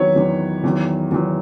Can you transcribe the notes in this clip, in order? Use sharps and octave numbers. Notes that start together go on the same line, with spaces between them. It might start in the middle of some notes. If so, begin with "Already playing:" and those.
Already playing: E2 D#3 F#3 B4 C#5
E2 D#3 F#3
E2 D#3 F#3
E2 D#3 F#3